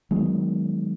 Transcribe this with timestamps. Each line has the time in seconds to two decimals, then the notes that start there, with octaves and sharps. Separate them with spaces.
0.11 D#3 F#3 G#3 B3